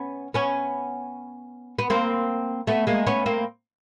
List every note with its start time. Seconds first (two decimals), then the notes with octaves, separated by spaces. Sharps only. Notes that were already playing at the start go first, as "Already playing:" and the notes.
Already playing: B3 C#4
0.34 B3 C#4
1.79 B3
1.90 A#3 C4
2.67 A3 B3
2.87 G#3 A#3
3.07 B3 C#4
3.26 A#3 C4